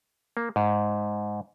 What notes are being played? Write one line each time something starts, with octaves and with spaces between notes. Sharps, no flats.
A#3
G#2